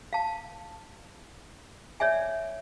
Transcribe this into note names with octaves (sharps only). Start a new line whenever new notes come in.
F5 A5
C#5 D5 E5 G#5